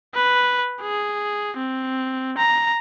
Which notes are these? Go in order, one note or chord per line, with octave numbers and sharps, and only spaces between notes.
B4
G#4
C4
A#5